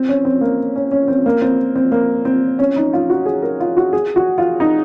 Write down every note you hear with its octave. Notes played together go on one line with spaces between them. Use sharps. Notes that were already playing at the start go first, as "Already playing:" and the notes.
Already playing: C4
C#4
C4
A#3
C#4
C#4
C4
A#3
C4
C4
A#3
C4
C#4
D#4
F4
F#4
G#4
A#4
F4
F#4
G#4
F#4
F4
D#4